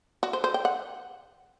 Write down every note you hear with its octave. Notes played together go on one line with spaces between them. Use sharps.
F#4
C5
C5
G5
F#5